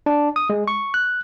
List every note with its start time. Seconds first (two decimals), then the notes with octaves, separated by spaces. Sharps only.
0.06 D4
0.36 D#6
0.50 G#3
0.68 C#6
0.94 F#6